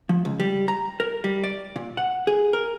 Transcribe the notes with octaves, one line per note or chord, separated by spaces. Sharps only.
F3
C#2
G3
A#5
A#4
G3
D5
A#2
F#5
G#4
A#4